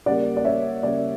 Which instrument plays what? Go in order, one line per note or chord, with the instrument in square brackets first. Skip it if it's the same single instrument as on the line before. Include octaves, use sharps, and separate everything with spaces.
[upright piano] C#3 G3 A#3 D5 F#5
D5
C#5 E5
C#3 G3 A#3 D5